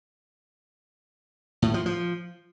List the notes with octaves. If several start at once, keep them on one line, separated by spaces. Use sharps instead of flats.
A2
F3
F3